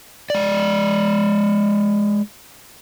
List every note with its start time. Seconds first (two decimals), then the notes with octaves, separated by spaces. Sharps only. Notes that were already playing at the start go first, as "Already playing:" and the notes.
0.30 G#3 D5